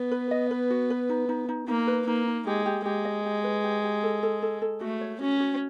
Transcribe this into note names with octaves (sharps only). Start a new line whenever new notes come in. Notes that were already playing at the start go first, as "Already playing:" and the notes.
Already playing: B3
B4
D#5
B4
F#4
B4
D#4
D#4
D#4
A#3 D#4
B4
A#3 D#4
D#4
G#3 G4
G4
G#3 G4
D#5
G4
B4
G4
G4
A4
A4
A4
A4
A3 F#4
C#5
C#4 F#4
F#4